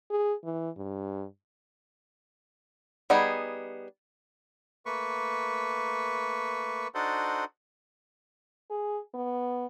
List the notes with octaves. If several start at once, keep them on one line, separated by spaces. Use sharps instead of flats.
G#4
E3
G2
G3 B3 D#4 G#4
A3 A#3 B4 C#6
D4 D#4 F#4 A4 C5
G#4
B3